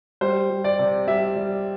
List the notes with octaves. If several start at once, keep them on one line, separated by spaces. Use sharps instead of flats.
G3 C5
G3
D5
C3
G3 E5
G3